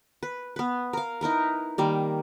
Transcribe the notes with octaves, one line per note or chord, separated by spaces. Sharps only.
B4
B3 B4
A#4 F5
D#4 E4 A#4 B4
D#3 G3 A#3